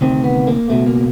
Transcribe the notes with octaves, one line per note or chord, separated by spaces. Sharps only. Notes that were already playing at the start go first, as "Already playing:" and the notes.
D2 C3 D#3 C4
B3
A#3
C#2 B2 A3
A#3